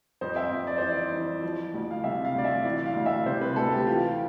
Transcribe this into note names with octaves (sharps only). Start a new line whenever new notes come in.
F2 C5
E5
F2
D5
C5
E3 D5
E3
F3
D2
F5
C3 E5
F5
D2 D5
E5
E3 D5
F5
D2
E5
C3 C5
B4
D2 A4
G4
E3 F4